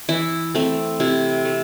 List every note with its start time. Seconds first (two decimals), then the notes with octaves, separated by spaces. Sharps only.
0.09 E3 E4
0.55 A3 C4
1.00 C3 E4
1.45 A3